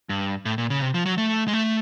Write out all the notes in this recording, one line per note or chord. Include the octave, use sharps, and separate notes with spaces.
G2
A2
A#2
C#3
C3
F3
F#3
A3
G#3
A3